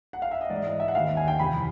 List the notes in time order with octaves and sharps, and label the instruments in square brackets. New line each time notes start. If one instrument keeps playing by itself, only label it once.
[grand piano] F#5
F5
E5
D#5
G#2 E3 D5
D#5
E5
F#5
D#2 D#3 F5
G#5
G5
F2 C3 E3 B5